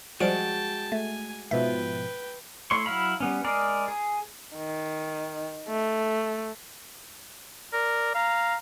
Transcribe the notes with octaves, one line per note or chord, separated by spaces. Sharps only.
F3 G3 G#3 F#4 G5 A5 D7
A3 G#5
G#2 B2 F3 B4 E5 G5
A3 E4 C#5 C6 C#6
F#3 E4 F5 B5
G3 B3 C#4
G#3 G#4 A#4 D5
G#4
D#3
A3
A#4 D5
F5 A#5